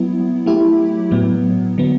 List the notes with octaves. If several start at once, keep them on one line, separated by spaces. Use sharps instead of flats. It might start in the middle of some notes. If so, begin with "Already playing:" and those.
Already playing: F#3 B3 E4
F#3 A3 E4 G4
A2 F#3 B3
D3 F#3 B3